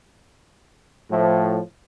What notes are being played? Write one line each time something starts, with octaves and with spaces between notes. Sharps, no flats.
A2 F3